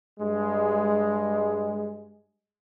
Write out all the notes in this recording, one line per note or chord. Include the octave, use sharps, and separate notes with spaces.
G2 G#3